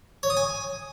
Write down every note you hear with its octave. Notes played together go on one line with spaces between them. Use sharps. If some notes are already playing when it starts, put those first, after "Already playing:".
C#5
D#6
G#5